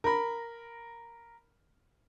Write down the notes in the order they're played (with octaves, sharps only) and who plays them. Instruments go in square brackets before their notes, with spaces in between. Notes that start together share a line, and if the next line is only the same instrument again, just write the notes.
[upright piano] A#4 B5